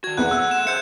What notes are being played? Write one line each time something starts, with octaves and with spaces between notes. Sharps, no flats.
D#3 F#4 G#6
E2 A3 B3 E4 F#5 F#6
E6 F#6
E7
G#4 C5 E5 F#6 G6 C#7